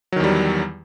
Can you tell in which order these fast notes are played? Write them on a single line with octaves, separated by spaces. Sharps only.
F#3 D#3 E2 G3